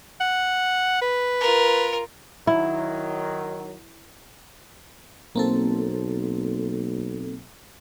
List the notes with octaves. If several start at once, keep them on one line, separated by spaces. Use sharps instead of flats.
F#5
B4
F4 A#4
D#3 F#3 E4
B1 A#3 C4 A4